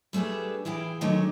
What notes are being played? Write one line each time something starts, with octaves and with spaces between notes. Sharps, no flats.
G3 A3 D4 G#4 B4
E3 E4 G#4 F5 G5
D3 D#3 F#3 G#3 A3